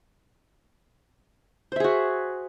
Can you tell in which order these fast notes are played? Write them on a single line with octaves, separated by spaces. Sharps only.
C5 E5 G#4 F#4